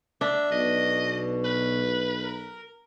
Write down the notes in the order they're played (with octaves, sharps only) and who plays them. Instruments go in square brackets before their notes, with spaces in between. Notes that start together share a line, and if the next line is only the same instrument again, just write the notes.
[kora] D4 [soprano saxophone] E5
[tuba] B1 [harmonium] B2 [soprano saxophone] D#5
[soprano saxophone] B4
[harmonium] A#4